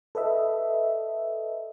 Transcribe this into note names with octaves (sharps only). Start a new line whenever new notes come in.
A4 B4 D#5 E5